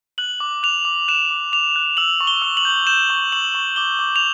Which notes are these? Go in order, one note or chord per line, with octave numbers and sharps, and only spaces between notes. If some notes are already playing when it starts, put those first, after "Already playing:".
F#6 F#7
D6
F#6 F7
D6
F#6 E7
D6
D6 F7
F#6
E6 F#7
C#6
G7
E6
F#7
G6
G6 E7
C#6
C#6 F#7
C#6
D6 G7
D6
F7